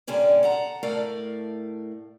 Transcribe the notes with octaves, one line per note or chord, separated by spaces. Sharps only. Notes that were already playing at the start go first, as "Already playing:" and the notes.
A#2 D3 G3 C#4 D5
A4 F#5 A#5
A2 A3 A#4 D5 F5